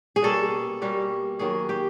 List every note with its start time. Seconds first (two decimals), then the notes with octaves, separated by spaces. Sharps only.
0.16 G#4
0.22 B2 G3 A#3 C#4 A4
0.82 B2 G3 A#3 C#4
1.39 D#3 F#3 A#3 G#4
1.69 G4